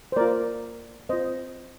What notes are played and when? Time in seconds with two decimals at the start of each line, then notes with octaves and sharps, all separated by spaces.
0.12 C5
0.16 A#3 F4 A#4 D5
1.09 C4 F4 C5 D#5